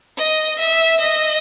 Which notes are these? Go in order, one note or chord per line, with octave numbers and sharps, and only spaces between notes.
D#5
E5
D#5